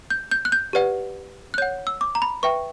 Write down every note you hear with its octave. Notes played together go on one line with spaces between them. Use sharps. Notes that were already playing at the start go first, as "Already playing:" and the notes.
G6
G6
F#6
G6
G4 B4 D5 F#5
F#6
C#5 F#5 G6
E6
D6
A#5
B5
B4 E5 G5 C#6